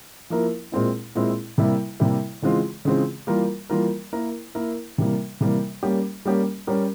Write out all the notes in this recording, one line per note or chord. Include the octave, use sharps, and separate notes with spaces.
F3 A#3 E4 A#4
A#2 G#3 C4 E4
A#2 G#3 C4 E4
C3 G3 A#3 E4
C3 G3 A#3 E4
C#3 E3 G#3 C4 F4
C#3 E3 G#3 C4 F4
E3 G3 A#3 F4 A#4
E3 G3 A#3 F4 A#4
A#3 E4 A#4
A#3 E4 A#4
C3 E3 G3 A#3
C3 E3 G3 A#3
G3 A#3 C#4 G4
G3 A#3 C#4 G4
G3 C#4 G4 A#4